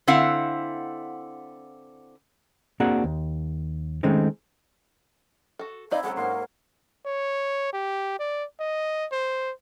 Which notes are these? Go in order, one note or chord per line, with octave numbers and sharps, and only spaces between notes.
D3 C4 E4 F5 F#5
A#3 C4 D4 F#4 G#4 F#5
D#2
D#3 G#3 A3 C4 C#4 D#4
F#4 A4
C4 D#4 E4 D5 D#5 F5
F#3 G#3 C#4 A4 F#5
G#2 A#3 A#4 C6
C#5
G4
D5
D#5
C5